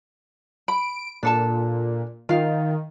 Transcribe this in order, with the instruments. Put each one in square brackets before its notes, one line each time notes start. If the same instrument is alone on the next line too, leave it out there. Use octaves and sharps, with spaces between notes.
[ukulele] B5 [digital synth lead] D7
[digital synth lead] A#2 [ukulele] D4 A4 A5
[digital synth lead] D#3 [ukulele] F4 F5